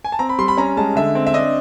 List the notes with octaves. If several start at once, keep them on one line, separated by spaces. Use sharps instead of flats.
G#5
A5
C4 A#5
B5
G3 C6
B5
C#4 A#5
G#3 A5
D3 E5
C4
E5
D4 D#5